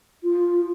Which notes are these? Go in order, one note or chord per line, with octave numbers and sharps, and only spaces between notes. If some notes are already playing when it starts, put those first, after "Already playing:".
F4